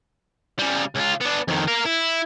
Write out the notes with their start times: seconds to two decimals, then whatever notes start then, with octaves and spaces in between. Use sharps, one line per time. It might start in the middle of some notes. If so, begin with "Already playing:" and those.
0.59 C#3 G3
0.96 C#2 F4
1.21 B3 D4
1.48 F2 D#3
1.68 A#4 F5
1.85 E4